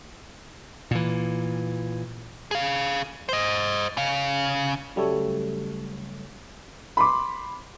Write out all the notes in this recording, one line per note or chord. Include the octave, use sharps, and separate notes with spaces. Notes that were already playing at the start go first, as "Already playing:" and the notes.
A#2 E3
G#4 F5
C5 D#5
C#3 F5
C#3 F#3 G3 A3 A4 C#5
B5 C6 D6